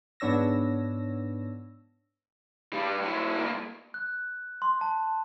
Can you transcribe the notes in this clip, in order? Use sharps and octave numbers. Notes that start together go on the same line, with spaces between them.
G#2 B3 D4 C#5 E6 A#6
G2 G3
F#3 E4
G2 A#3
F#6
C6
A5